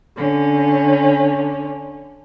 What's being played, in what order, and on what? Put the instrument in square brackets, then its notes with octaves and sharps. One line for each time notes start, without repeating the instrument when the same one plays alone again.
[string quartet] D3 C#4